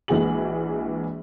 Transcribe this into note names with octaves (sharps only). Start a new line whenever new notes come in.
A#1 E3 G#3 F#4 G#4 F#7